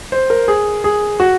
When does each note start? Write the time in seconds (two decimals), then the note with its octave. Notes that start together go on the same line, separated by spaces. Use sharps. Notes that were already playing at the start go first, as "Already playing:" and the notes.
0.12 C5
0.30 A#4
0.48 G#4
0.84 G#4
1.20 F#4